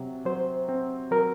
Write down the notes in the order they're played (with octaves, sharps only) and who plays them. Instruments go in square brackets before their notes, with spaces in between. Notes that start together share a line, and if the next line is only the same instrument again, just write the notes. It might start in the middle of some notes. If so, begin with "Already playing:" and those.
Already playing: [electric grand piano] C3 F#3
[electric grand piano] F#3 [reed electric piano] C5
[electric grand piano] C4
[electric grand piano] F#3 [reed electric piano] A#4